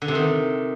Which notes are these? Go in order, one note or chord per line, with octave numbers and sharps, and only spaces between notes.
D3
C3
D#3